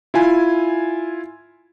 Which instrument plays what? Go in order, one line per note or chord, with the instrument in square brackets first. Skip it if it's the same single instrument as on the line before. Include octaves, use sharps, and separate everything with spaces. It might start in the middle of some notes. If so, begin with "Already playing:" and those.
[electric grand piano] E4 F4 G#5